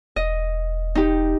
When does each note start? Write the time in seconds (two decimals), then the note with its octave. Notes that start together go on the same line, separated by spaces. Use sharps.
0.16 E1 D#5
0.95 D#4 G4